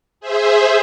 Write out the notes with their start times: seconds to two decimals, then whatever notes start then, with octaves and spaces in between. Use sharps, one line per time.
0.20 G#4 C5 E5